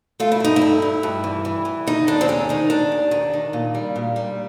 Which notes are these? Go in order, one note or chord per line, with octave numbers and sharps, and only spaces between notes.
A3 F4
E4
G2 D#4
E4
G2
G2
G2
E3
E3
E3
D#3 D#4
D#2 D4
C4
G#3 C#4
D#3 D#4
D#3 D4
D#2
D#3
D#3
A#2
G3
A#2
G3